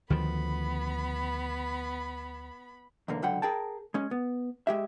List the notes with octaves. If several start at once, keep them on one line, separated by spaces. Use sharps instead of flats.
D2 D#3 F3 B3 B5
B1 E2 D3 A#3
C#2 D3 F#3 B4 F#5 G5
G#4 A#4 G5 A5
G#3 C#4
B3
G#3 G4 E5